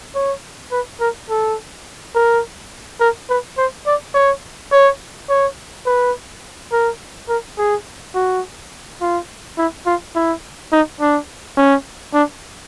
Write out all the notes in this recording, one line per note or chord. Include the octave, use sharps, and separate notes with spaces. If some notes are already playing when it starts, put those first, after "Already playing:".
C#5
B4
A#4
A4
A#4
A#4
B4
C5
D5
C#5
C#5
C#5
B4
A#4
A#4
G#4
F#4
F4
E4
F4
E4
D#4
D4
C#4
D4